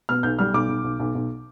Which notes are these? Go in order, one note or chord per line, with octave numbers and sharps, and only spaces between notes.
B2 F6
B1 G6
G3 F6
B1 D6
B1
B1
B1
B1